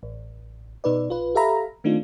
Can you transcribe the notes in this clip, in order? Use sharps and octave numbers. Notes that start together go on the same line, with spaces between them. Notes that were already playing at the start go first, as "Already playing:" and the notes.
A1
B2 D#4 B4 D5
A#1 F4 B4
G4 A4 E5 F5 A#5 B5
D#3 A3 C4 D4 D#4 F4